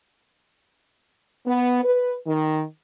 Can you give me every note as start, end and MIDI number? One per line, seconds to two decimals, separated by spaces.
1.47 1.79 59
1.84 2.14 71
2.26 2.62 51